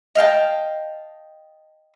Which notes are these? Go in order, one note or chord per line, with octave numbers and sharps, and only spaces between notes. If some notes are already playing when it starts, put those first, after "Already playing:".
D#5 F5 G5 A5